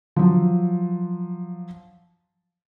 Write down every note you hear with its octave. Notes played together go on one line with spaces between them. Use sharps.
F3 F#3